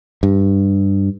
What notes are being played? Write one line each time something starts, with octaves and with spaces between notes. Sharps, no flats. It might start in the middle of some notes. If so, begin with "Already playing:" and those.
G2